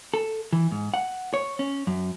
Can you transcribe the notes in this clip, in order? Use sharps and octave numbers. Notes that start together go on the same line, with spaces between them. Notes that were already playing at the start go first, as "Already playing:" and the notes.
A4
E3
G#2
F#5
C#5
C#4
F#2